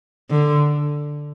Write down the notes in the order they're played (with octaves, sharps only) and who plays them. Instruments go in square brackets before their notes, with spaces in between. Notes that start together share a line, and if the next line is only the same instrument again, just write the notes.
[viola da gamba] D3